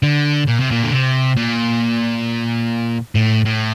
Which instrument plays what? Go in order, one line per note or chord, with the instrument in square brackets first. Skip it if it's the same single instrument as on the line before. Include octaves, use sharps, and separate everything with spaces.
[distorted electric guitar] D3
A#2
C3
A#2
D3
C3
A#2
A2
A2